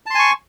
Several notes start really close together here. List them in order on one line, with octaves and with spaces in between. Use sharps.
A5 C6 G#5 C#6